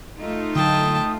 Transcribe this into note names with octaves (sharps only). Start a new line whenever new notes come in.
A3 D#4 F4
D3 F#3 G5 A5 D#6